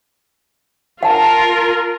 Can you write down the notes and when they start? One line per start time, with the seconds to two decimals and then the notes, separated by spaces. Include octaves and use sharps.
1.03 F4 A#4 F#5 A5